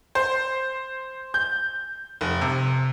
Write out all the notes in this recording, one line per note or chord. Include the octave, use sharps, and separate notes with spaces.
C5
G6
F1
C3